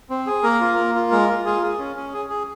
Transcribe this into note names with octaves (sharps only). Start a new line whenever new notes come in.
C4
G#4
A#3 A#4
F4
A#3
F4
G#3 A#4
F4
F4 G#4
G#4
C#4
C#4
G#4
G#4